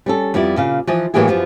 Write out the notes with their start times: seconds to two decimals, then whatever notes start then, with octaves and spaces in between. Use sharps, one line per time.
0.06 G3 C#4 A4
0.34 F2 G3 B3 E4 D5
0.56 A#2 C#3 F5
0.87 E3 F3 D#5
1.14 A2 E3 F#3 A#3 G4 G#4
1.28 F#2 F3 B3